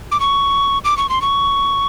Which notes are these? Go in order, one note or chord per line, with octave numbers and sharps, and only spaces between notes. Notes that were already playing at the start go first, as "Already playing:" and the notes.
D6
C#6
D6
C#6
C6
C#6